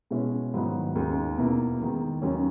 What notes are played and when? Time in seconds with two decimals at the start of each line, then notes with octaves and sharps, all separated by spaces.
0.11 B2 G#3 C#4 E4
0.54 G#2 D#3 F#3 B3 E4
0.95 D#2 C#3 G#3 D#4
1.38 E2 B2 A#3 E4
1.80 E2 D#3 G#3
2.22 D#2 C#3 F#3 C#4